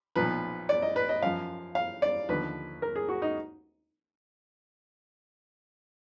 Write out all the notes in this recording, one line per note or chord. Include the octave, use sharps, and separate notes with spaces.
B1 A#2 F3 B4
D5
D#5
B4
D#5
F#2 F3 F5
F5
D5
D#2 D3 F3 B4
A#4
G#4
F#4
D#4